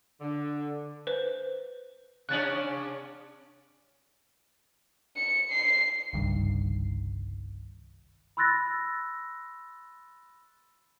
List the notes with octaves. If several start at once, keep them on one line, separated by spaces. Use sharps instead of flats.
D3
B4 C5
C3 C#4 D4 F#6 A6 F#7
C#7
C7
F#1 C2 G2 D#3
B5 C6 E6 F#6 A6 A#6